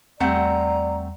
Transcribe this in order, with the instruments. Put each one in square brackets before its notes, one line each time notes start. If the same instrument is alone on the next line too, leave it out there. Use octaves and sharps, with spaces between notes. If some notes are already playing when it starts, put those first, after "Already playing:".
[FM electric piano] E2 G3 [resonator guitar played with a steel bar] A3 C4 F#5 [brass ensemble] D5 [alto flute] A#5